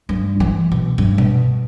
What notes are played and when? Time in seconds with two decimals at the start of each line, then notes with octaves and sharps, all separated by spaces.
0.09 G2
0.40 E3
0.72 B2
0.98 G2
1.18 B2